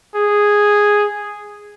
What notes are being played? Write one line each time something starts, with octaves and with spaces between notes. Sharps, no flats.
G#4